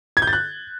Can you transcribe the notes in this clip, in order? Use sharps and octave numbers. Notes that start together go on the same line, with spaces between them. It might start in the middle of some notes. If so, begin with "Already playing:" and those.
G#6
G6
A6
F#6